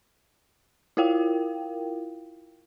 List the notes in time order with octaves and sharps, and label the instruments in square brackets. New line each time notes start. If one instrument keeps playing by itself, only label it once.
[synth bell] E4 F4 A#4 F5 G5